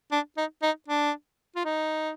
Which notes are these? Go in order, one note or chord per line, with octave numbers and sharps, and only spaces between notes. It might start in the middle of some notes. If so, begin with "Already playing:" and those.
D4
D#4
D#4
D4
F4
D#4